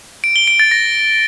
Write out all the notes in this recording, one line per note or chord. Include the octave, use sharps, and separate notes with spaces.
D7
G7
D7
A6
A#6